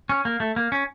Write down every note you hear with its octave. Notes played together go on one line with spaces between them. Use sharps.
C#4
A#3
A3
A#3
C#4